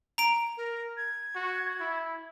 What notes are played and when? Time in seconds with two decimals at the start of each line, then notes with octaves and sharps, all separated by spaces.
0.18 A#5 D7
0.57 A#4
0.97 G#6
1.35 F#4
1.80 E4